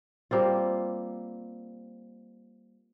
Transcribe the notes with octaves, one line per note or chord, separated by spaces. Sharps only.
G3 A#3 C4 F4